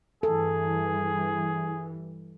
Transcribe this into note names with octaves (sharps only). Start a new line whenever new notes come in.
G2 E3 G3 G#4 A4